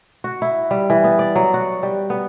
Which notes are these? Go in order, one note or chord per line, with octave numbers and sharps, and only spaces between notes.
F#4
E4
G3
E3
B3
D5
F#3
F#4
G3
B3